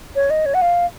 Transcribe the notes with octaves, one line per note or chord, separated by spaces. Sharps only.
C#5
D#5
C#5
F#5
F5